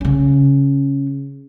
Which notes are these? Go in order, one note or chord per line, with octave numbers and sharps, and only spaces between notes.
C#3 C#4